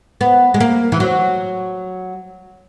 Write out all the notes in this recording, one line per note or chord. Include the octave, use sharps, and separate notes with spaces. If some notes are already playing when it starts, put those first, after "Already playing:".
B3
G#3
A#3
E3
F#3